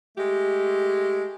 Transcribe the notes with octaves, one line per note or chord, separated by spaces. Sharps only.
G#3 A3 G4